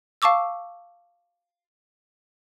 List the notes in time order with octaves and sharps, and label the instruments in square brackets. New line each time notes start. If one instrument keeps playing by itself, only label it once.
[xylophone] F5 A5 C#6 D6 E6